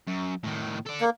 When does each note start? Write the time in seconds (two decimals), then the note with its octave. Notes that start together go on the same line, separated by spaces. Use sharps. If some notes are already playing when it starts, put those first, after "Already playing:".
0.08 F#2
0.44 A2 D#3
0.87 A4 D5
1.01 A#3